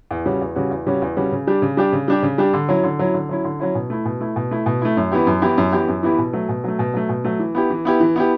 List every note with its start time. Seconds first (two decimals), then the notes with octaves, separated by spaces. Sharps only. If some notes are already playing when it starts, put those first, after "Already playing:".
0.11 E2
0.26 C#3 G3 C#4 F#4
0.41 E2
0.56 C#3 G3 C#4 F#4
0.71 E2
0.86 C#3 G3 C#4 F#4
1.02 E2
1.17 C#3 G3 C#4 F#4
1.32 C#3
1.47 G3 D4 G4
1.62 C#3
1.77 G3 D4 G4
1.93 C#3
2.08 G3 D4 G4
2.23 C#3
2.38 G3 D4 G4
2.53 D3
2.69 F#3 C#4 E4
2.84 D3
2.99 F#3 C#4 E4
3.14 D3
3.29 F#3 C#4 E4
3.44 D3
3.60 F#3 C#4 E4
3.75 B2
3.90 A3 E4
4.05 B2
4.21 A3 E4
4.36 B2
4.51 A3 E4
4.66 B2
4.82 A3 E4
4.97 F#2
5.12 E3 B3 E4 G4
5.27 F#2
5.42 E3 B3 E4 G4
5.58 F#2
5.72 E3 B3 E4 G4
5.88 F#2
6.03 E3 B3 E4 G4
6.18 B2
6.33 F#3 A3
6.49 B2
6.64 F#3 A3
6.79 B2
6.94 F#3 A3
7.09 B2
7.24 F#3 A3
7.39 E3
7.55 B3 E4 G4
7.70 E3
7.85 B3 E4 G4
8.00 E3
8.16 B3 E4 G4